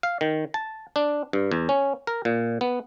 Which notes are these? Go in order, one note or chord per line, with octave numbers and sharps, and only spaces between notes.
F5
D#3
A5
D4
G2
E2
C#4
A#4
A#2
B3